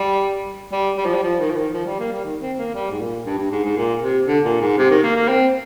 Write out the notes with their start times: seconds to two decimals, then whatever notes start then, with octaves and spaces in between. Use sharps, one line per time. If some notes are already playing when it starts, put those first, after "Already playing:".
Already playing: G3
0.72 G3
0.98 G3
1.06 F3
1.14 G3
1.23 F3
1.40 D#3
1.50 F3
1.57 D#3
1.74 F3
1.86 G3
2.00 A#3
2.12 G3
2.25 D#3
2.41 C4
2.58 A#3
2.75 G3
2.91 G#2
3.01 A#2
3.26 G2
3.38 G2
3.51 G#2
3.64 G#2
3.77 A#2
4.02 C3
4.27 D3
4.44 A#2
4.61 G#2
4.78 C3
4.90 D#3
5.03 A#3
5.16 A#3
5.28 C4